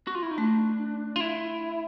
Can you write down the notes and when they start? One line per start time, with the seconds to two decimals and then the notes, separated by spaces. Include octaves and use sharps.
0.07 F#4
0.15 F4
0.23 E4
0.31 D#4
0.38 A3 D4
1.16 F4
1.20 E4